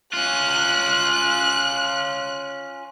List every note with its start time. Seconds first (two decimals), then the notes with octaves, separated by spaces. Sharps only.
0.13 C#4 F4 F#6